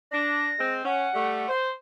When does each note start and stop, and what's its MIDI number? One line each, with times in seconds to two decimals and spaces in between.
0.12 0.54 62
0.12 0.74 94
0.59 0.83 56
0.59 0.83 60
0.85 1.08 61
0.85 1.51 78
1.14 1.46 55
1.14 1.46 57
1.49 1.70 72